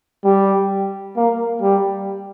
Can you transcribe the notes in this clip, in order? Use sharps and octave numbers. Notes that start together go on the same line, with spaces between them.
G3
A#3
G3